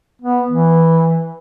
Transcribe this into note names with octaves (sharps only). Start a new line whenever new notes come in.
B3
E3